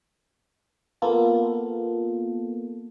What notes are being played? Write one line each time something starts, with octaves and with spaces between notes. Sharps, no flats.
A#3 B3 F4 A4